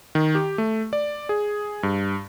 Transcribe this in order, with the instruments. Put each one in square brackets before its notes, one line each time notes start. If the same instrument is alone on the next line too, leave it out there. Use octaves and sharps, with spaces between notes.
[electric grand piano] D#3
G4
A3
D5
G#4
G2